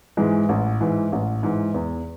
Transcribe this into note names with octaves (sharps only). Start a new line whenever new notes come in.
G#2 E3 G#3
A1
G#2 E3
A1
G#2 E3
E2